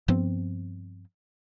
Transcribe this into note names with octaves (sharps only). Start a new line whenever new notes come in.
G2 F3 B3 C4